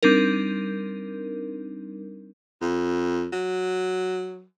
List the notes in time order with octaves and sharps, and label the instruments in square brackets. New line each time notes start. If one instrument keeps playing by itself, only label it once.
[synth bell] G3 C4 D4 D#4 A#4
[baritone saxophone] F2
F#3